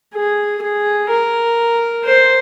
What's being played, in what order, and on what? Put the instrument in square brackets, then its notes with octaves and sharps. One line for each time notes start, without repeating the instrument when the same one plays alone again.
[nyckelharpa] G#4
G#4
A#4
C5